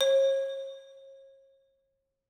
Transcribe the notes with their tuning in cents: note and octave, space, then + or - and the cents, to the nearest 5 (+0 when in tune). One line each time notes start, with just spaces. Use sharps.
C#5 -40